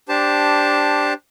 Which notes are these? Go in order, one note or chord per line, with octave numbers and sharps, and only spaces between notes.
D4 G4 C5 A5